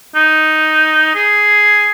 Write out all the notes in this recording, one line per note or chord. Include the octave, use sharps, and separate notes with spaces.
D#4
G#4